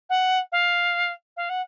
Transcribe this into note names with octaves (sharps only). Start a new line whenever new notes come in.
F#5
F5
F5
F#5